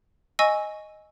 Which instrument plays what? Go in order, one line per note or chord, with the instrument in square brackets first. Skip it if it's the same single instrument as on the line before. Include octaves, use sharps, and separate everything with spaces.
[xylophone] D#5 G#5 C#6 E6 A#6